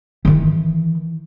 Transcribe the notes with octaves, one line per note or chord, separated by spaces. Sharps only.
D#3 E3